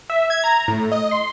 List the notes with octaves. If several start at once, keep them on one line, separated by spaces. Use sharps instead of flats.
E5
G#6
A#5
A2
D#5
C6